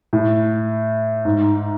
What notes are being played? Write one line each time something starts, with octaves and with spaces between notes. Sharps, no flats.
A2
G#2